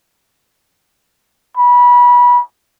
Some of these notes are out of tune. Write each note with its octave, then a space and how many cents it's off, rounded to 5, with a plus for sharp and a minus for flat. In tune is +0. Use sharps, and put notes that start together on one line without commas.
B5 -25